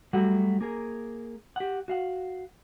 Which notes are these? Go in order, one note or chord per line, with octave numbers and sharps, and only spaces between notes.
F#3 G3 A3 F#4 A4 F#5
A#3 G#4 A#4
G4 F#5
F#4 F5 F#5